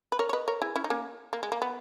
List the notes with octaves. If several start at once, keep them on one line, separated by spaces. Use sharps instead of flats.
B4
A#4 C#5
C#5
B4 D#5
A#4 C#5
E4 G#4
C#4 E4
D#4
A#3 C#4
A#3
G#3
A#3
B3